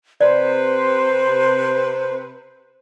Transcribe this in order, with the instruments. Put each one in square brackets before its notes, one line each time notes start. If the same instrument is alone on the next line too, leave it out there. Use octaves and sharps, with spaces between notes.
[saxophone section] C3 B4 [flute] C5 [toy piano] D5